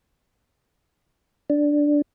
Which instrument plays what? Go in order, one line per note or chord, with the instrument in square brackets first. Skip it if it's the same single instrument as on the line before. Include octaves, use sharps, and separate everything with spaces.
[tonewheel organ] D4